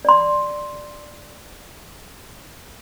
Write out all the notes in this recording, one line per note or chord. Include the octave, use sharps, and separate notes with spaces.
D5 C6